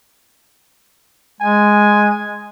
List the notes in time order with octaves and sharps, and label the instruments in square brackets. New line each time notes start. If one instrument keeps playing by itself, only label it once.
[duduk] G#3 [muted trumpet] G#5